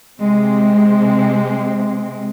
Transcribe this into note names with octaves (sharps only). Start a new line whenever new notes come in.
C3 G#3 C4